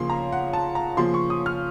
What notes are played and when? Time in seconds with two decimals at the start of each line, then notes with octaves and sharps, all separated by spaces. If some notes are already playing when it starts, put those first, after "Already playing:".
Already playing: C#3 F3 A#3 C6
0.10 A#5
0.32 F#5
0.53 A5
0.75 A#5
0.97 C#3 F3 A#3 C6
1.14 C#6
1.30 D#6
1.46 F6